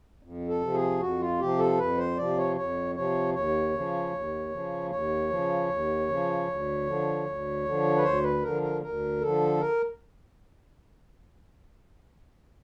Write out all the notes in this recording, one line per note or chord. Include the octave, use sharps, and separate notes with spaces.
F2
A4
C3 F3
G#4
F2 F#4
F4
C3 F3 G4
A4
F2 B4
C5
C3 F3 D5
C#5
F2 C#5
C3 F3 C#5
D#2 C#5
C#3 F3
D#2
C#3 F3
D#2 C#5
C#3 F3
D#2
C#3 F3
D2
D3 F3
D2
D3 F3
B4
D2 C5
B4
D3 F3 A#4
A#4
D2 A#4
D3 F3 A4
A#4